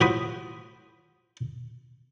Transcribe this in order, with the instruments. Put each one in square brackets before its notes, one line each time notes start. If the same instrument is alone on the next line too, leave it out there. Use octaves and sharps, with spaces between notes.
[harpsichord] A2 F3 F#4 C5 B5 D#6